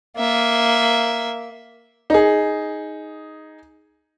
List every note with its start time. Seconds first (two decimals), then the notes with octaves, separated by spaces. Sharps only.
0.17 A#3 E5
2.10 D#4 G#4